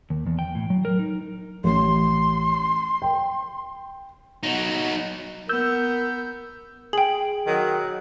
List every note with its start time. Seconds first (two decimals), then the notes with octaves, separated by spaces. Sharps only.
0.10 D#2
0.26 E2
0.39 G5
0.55 A2
0.70 F#3
0.85 A#4
0.99 D#4
1.64 A1 C6
3.02 G5
4.43 F#3 D#4
5.49 B3 A#4 E6 G6
6.93 G#4 G5 F#7
7.47 D#3 F#3